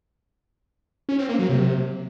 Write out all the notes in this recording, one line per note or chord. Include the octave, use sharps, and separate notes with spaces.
C#4
C4
A#3
F#3
C3